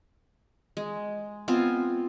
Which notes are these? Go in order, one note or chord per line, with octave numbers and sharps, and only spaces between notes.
G#3
B3 C4 F4 G#5